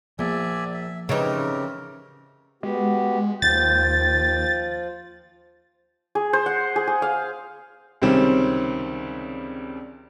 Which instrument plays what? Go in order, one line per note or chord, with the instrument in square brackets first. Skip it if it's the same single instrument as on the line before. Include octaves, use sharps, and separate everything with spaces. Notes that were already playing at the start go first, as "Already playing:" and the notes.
[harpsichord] A#1 [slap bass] F3 [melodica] D5 E5 G#5
[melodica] E5
[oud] C#3 D#4 [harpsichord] E3 [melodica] C4 G4 A#4
[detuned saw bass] G#3 [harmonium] B3 F#4 G4
[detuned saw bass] D#2 [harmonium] F3 F4 [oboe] G5 [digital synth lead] A6
[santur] G#4
C5
F#5
G#4
G#4
F5
[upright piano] C#2 C3 D#3 G3 C4 C#4